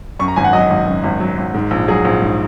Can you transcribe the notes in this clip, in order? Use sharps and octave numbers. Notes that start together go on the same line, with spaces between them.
F#2 C#6
A#5
G#1 G#5
F#5
F#3 D#5
G#1
F#2
G#1
F#3
G#1
G#2
A#1
F#3 G#4
A#1
G#2